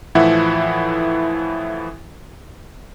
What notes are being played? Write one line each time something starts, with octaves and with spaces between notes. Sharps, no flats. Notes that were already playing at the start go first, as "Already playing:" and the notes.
A2 E3 F3 E4 E5 F#5